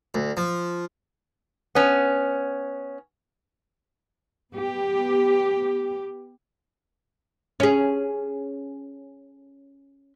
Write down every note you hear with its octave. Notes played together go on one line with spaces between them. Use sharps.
D2
F3
B3 C#4
B3 G4
C#4 G#4